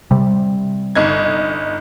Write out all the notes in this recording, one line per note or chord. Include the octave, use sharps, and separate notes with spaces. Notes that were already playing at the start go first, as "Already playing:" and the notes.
C3 G3
G1 D#4 G#6